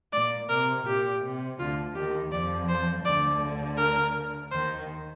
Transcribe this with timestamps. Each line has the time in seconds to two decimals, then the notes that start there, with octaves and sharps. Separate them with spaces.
0.13 A#2 D5
0.49 C3 A#4
0.86 A#2 G4
1.23 C3
1.59 D2 D3 F4
1.96 D#2 D#3 G4
2.32 F2 F3 D5
2.69 C5
3.05 D2 D3 D5
3.77 A#4
4.51 D#2 D#3 C5